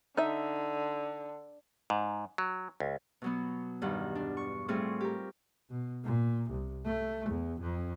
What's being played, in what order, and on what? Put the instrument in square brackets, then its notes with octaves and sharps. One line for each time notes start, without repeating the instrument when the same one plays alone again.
[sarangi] D3 [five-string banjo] D#4 E5
[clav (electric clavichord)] G#2
F#3
C#2
[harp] B2 F#3 B3
E2 G2 D#3 F#5
D4
C#6
A2 G3 C4 F4 G#4 C#6
G4 A#4
[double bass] B2
A#2
C2
A3
E2
F2